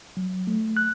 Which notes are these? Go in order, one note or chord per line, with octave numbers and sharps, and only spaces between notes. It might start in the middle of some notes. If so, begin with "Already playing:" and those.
F#3
A3
F#6